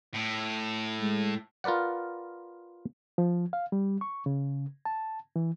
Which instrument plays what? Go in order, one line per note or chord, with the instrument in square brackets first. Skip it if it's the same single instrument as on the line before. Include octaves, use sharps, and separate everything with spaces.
[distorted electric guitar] A2
[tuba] G#3
[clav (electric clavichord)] F4 A#4 B4 D5 F#5
[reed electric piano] F3
F5
G3
C#6
C#3
A5
E3